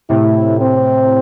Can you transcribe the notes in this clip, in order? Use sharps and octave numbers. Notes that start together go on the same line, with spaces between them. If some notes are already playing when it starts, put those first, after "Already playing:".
A2 C3 E4
C4